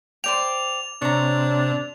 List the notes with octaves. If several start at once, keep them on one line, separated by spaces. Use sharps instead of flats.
C5 D5 G5 F7
C3 D4 C#5 A#5